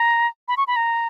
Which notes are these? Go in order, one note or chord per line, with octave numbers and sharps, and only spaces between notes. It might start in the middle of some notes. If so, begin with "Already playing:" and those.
Already playing: A#5
B5
C#6
B5
A#5